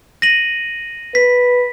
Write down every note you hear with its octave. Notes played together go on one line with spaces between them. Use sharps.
A#6 D#7 F#7
B4 B6